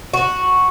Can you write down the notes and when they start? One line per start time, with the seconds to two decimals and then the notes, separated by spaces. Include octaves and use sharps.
0.13 F#4